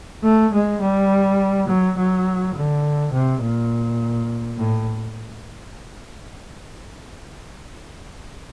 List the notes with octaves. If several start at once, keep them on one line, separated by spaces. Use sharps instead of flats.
A3
G#3
G3
F#3
F#3
D3
C3
A#2
A2